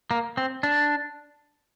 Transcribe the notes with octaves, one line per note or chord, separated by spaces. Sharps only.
A#3
C4
D4